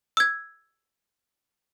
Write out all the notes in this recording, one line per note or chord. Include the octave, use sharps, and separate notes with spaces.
E6 G#6